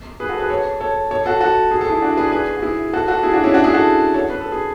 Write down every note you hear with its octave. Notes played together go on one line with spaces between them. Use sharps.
G#4 B4
F#4 A4
G#4 B4
A4 C#5
A4 C#5
A4 C#5
F#4 A4
F#4 A4
G#4
A4
E4 G#4
D4 F#4
G#4 B4
G#4 B4
F#4
E4 G#4
F#4 A4
F#4 A4
E4 G#4
D4 F#4
C#4 E4
D4 F#4
E4 G#4
F#4 A4
A4 C#5
B4
A4
G#4